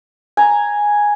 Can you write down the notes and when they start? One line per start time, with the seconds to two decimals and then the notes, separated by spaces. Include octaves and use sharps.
0.37 G#5 A#5